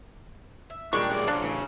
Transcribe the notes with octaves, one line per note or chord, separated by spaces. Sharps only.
E5
A#2 D#3 G3 G#3 D4 G4 C#6
B1 D5
A#3 D4 F4 C5
A1 C#3 F#3 A3